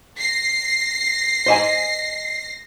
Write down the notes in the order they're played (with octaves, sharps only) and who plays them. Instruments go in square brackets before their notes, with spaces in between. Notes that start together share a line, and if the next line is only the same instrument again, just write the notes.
[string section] A#6 C7
[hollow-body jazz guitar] C5 D#5 G#5